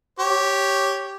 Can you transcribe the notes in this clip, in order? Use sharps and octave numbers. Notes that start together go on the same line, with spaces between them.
G4 C#5